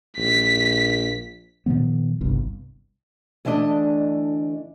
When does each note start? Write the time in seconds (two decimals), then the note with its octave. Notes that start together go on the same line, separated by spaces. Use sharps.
0.18 A#1 B6
1.66 A#2 D#3 F3 B3
2.21 G1 C2 G2
3.45 D2 E3 A3 D4 D#5